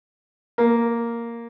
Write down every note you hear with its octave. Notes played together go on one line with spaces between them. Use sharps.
A#3